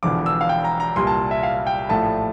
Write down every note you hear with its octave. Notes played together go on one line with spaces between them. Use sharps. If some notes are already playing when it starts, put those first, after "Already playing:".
E1 E2 D3 F3 D6
E6
F5
G5
A#5
A#5
C2 A#2 G3 C6
A5
E5
F5
G5
A#1 A2 F3 A3 A5